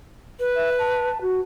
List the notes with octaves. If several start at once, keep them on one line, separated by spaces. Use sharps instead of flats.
B4
E5
A5
F#4